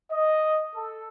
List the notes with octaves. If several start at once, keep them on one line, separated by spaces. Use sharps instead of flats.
D#5
A4